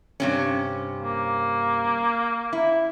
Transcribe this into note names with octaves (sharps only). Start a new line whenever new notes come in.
G2 C3 C#4
A#3
E4